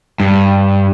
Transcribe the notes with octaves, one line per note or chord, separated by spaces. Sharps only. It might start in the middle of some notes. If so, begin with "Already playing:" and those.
G2